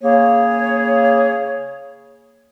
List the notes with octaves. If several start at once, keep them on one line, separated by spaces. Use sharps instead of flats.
C#3 A#3 G#4 C#5